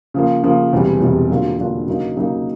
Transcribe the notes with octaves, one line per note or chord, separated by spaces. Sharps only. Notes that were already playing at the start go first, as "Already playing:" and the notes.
C#3 F3 A#3
C#3 F3 A#3
E1 E2 C3 E3 G3
E1 E2 C3 E3 G3
D3 F#3 A#3 D4 F4
D3 F#3 A#3 D4 F4
C#3 F#3 A#3 D#4
C#3 F#3 A#3 D#4